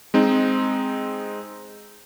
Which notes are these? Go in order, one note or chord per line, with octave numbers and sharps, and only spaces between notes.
G#3 C4 D#4